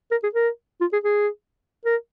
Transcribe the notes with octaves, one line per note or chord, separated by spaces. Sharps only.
A#4
G#4
A#4
F4
G#4
G#4
A#4